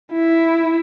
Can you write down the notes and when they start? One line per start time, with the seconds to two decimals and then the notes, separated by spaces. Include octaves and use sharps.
0.12 E4